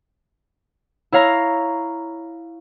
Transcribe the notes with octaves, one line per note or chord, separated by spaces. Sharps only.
E4 C#5 F5 A#5